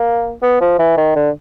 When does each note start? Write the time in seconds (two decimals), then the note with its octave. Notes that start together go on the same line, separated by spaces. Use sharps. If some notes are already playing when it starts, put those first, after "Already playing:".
Already playing: A#3
0.42 B3
0.61 F3
0.79 E3
0.97 D#3
1.16 D3